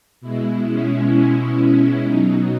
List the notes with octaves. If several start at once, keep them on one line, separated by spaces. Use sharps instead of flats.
B2 G#3 E4
C#4
B2 F#3 D#4